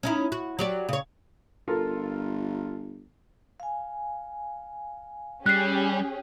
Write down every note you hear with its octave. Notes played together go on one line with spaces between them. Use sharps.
C#4 D#4 E4
F#4
F#3 G4 D5
C#3 C#5
G1 F4 A4 A#4
F5 G#5
G3 C#4 G4 G#4 F#6 C7